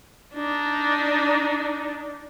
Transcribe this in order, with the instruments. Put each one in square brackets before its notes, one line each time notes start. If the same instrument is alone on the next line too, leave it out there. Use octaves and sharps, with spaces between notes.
[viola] D4 D#4